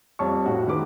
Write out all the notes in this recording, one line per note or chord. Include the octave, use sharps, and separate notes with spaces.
F2 G3 C#5 A5 C#6
A2 F#4
D#3 G#3 B4 D6